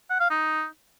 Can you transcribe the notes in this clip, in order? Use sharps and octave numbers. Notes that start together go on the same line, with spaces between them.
F#5
F5
D#4